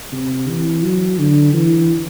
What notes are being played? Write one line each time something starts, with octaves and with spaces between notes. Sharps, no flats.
C3
E3
F#3
D3
E3